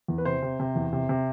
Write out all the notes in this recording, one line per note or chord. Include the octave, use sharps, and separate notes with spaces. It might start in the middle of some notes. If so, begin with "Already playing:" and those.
E2
B4
C3 C5
C3
C3
E2
C3
C3